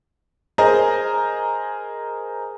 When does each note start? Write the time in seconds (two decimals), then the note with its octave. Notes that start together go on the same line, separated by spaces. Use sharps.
0.58 G#4 A#4 C5 D#5 G#5 A#5